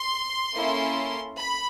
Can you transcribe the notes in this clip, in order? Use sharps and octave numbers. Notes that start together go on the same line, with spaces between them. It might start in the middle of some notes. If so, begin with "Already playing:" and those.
Already playing: C6
A#3 C#4 E4 A4
B5